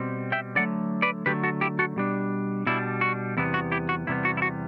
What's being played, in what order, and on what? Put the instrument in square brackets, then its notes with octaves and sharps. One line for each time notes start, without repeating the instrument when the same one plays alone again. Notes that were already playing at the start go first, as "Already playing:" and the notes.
Already playing: [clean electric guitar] B2 G3 C4
E5 G5
D3 F#3 A3 D5 F#5
B4 D5
D3 F#3 A3 G4 B4
F#4 A4
E4 G4
F#4 A4
B2 G3 D4
B2 G3 D4 E4
F#4
E2 C3 G3 B3 E4
F#4
E4 G4
F#4
E2 C3 G3 B3 E4
F#4
E4
F#4